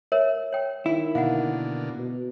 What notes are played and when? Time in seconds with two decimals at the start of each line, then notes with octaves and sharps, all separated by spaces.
0.12 A#4 C#5 E5
0.52 C#5 G5
0.86 D#3 E4
1.15 B2 D3 A#3 F5 F#5
1.98 B2